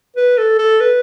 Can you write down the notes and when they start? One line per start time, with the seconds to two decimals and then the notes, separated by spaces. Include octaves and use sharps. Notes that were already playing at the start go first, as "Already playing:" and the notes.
0.16 B4
0.38 A4
0.59 A4
0.81 B4